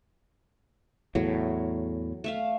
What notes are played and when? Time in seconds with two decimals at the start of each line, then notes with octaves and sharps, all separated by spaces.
1.15 E2 A2 F#3
2.24 A3 E5 F5